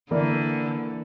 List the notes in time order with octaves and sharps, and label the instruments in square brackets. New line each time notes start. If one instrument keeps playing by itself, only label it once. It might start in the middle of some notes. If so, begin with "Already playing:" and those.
[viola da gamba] D3 [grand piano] E3 A#3 E4 A#4 D5